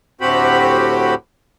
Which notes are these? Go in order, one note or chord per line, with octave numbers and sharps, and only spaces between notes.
D2 A2 C4 F#4 G4 B5